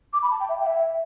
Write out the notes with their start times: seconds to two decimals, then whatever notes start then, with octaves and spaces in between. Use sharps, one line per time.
0.13 D6
0.22 B5
0.31 A5
0.40 G5
0.49 E5
0.60 G5
0.67 E5